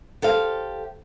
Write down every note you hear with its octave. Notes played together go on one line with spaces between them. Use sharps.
G4 A4 C5 F5